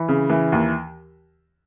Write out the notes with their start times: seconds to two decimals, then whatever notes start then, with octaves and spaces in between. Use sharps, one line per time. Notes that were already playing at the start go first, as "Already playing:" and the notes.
Already playing: E3 B5
0.08 C#3
0.30 E3
0.52 D#2